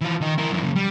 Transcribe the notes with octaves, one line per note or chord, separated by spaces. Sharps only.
E3 F4
D#3 D#4
E4 A#4
F#2 E3
F#2 C#3
G3